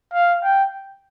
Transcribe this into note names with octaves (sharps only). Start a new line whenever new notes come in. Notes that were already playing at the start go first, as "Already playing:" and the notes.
F5
G5